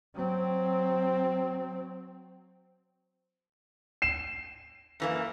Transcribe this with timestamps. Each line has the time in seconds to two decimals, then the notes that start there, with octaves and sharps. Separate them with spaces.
0.15 F#3 C4
4.02 C7 E7
5.00 F#2 E3 A#3